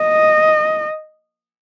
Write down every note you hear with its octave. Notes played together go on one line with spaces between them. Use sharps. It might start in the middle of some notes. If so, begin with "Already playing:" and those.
Already playing: D#5